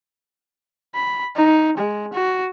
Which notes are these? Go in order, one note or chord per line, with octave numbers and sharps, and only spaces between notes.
B5
D#4
G#3
F#4